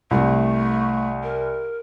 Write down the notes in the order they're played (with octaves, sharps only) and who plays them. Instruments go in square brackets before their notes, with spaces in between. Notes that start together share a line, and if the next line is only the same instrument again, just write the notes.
[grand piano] C2 [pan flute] A3
[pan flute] A#4